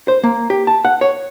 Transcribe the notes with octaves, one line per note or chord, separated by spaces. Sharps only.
C5
A#3
G4
A5
F#5
C#5